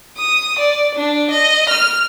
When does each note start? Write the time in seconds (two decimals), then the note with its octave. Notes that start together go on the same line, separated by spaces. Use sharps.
0.17 D#6
0.59 D5
0.95 D4
1.31 D#5
1.69 F6